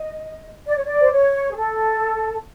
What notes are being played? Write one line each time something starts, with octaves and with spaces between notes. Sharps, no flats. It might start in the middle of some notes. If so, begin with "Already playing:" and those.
Already playing: D#5
D5
C#5
D5
C5
C#5
G#4
A4